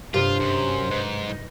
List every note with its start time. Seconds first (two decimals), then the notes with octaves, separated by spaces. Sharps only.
0.14 G2 C3 F#3 D4 F4 G4 A#4 C5
0.40 F#2
0.91 G#2 B4 G6
1.29 D#4